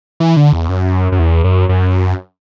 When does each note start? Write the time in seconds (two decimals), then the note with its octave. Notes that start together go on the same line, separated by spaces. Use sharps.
0.20 E3
0.37 D3
0.53 E2
0.69 F#2
1.12 F#2
1.19 E2
1.44 F#2
1.69 F#2